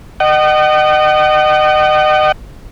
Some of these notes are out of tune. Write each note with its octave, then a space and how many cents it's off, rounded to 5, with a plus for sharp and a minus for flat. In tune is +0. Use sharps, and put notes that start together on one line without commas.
D#5 -30 F#5 +45